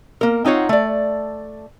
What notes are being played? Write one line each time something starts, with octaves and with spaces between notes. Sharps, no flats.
A#3 A#4
C4 D#4 F4 C#5 F#5
A3 D5